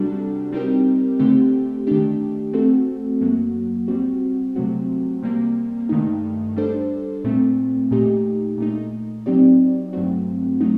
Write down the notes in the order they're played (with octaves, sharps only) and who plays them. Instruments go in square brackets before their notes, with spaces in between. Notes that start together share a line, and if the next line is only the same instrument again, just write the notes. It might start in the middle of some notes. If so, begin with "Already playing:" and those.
Already playing: [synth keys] C3 G3 D4 F#4 A4
G3 C4 D#4 G4 A#4
D3 A3 C4 G4
D#3 A3 D4 G4
A3 C4 F#4 A4
F#2 F#3 A#3 F#4
G3 C4 F#4
C3 F#3 A3 C4 F#4
C3 G3 A#3
G2 D#3 A3 D#4
G3 D4 A4 C5
A#2 A3 C4
A#2 A3 D#4 G4
A#2 A3 D#4
F#3 C4 D#4 G4 D5
G2 F#3 A3 C4 F#4
F#3 A3 D#4